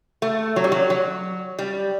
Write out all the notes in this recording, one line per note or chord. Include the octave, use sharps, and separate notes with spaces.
A3
F#3
G3
F#3
F#3
G3